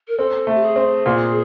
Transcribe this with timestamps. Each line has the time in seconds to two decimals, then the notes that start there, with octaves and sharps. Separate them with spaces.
0.08 A#4
0.18 C4 A4
0.47 A3
0.55 G4
0.62 G#4
0.76 C4
1.06 A#2